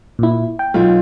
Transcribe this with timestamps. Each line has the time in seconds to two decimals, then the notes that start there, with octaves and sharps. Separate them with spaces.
0.19 A#2 E4
0.59 G5
0.74 B1 F4